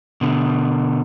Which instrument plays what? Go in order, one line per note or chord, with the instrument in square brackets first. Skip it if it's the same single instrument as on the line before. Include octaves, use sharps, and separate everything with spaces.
[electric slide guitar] B2 D3